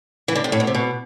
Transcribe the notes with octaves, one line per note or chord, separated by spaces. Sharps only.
E3
D3
C3
A2
B2
C3
B2